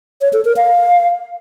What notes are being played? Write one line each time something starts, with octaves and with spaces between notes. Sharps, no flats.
C#5
A4
A#4
F5